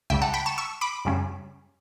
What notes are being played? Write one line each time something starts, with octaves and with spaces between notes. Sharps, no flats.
C#2 C#3 G3 E5 G5
F#5 A5
G5 B5
A5 C#6
C#6 E6
B5 D6
F#2 C#3 G3 C#4